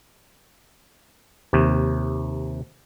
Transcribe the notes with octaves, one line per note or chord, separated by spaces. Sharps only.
D#2 C3